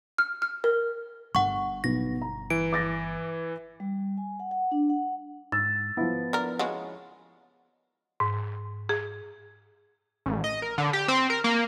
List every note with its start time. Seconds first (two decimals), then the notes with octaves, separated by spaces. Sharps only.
0.18 F6
0.42 F6
0.64 A#4
1.35 G1 F#5 C#6
1.84 B1 B3 A#6
2.22 A#5
2.50 E3 D7
2.73 D6 A6 A#6
3.80 G3
4.17 G#5
4.40 F#5
4.51 F#5
4.71 D4
4.90 F#5
5.52 G#2 E6 A6
5.97 F3 B3 E4
6.33 D3 A#4
6.59 C#3 G#3 F#4
8.20 G#2
8.89 G#4
10.26 A1
10.44 D#5
10.62 A#4
10.78 D3
10.93 G4
11.08 C4
11.30 A#4
11.44 A#3